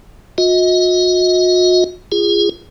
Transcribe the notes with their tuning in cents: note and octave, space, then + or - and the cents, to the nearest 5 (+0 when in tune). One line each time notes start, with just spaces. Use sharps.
F#4 -45 D#5 +35
F4 -25 G#4 -25